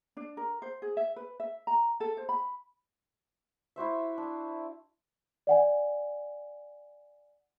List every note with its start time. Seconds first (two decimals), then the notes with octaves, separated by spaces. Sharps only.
0.17 D4
0.37 A#4
0.62 C5
0.82 G#4
0.97 E5
1.16 B4
1.40 E5
1.67 A#5
2.00 A4
2.17 C5
2.29 B5
3.76 E4 F#4 C5 E5
4.18 D4
5.47 D5 F#5 G#5